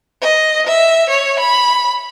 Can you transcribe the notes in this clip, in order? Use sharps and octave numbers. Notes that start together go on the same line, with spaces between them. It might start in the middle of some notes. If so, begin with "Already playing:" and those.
D#5
E5
C#5
B5